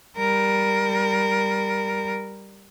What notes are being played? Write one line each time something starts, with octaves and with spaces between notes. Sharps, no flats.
G3 A#4